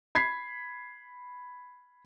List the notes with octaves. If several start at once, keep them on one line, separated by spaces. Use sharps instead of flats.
B5 G#6 B6 C7